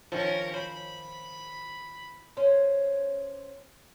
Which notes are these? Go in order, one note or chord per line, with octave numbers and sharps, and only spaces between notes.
D#3 F3 C#4 A#4
C5 B5
C#4 C5